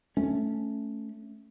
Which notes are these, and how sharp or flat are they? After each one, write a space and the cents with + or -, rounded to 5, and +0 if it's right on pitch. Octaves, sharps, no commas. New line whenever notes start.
A3 +0 C#4 +0